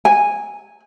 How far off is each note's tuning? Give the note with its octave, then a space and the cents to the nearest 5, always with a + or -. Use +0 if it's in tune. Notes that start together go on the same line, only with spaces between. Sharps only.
G#5 -10